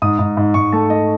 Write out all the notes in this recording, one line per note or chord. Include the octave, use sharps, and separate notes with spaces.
G#2 D#6
G#2
G#2
G#2 C#6
A3 A5
A3 D#5